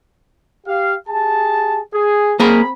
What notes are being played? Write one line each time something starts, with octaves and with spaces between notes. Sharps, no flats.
G4 F5
G4 G#4 A5
G#4
A#3 C4 G#4 A#4 B5